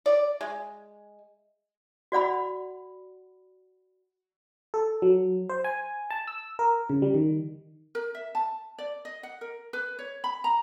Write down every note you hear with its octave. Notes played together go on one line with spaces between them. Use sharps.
D5
G#3
F#4 D5 F#5 B5
A4
F#3
C5
G#5
A5
E6
A#4
C#3
G3
D#3
A#4
E5
A5
D5
D#5
F#5
A#4
B4
C#5
B5
A#5